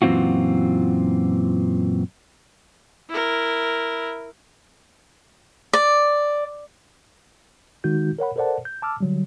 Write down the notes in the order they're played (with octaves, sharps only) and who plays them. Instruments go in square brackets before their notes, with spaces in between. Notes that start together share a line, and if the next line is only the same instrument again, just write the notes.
[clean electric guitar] F#2 A#2 E3 C4 F4 F#4
[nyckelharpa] E4 A#4
[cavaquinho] D5
[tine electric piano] D#3 G#3 D#4 F#4 G6
A#4 C#5 F#5 B5
A4 A#4 C5 D5 F#5 A5
G6
A5 D6 E6 F6
D3 F#3 G3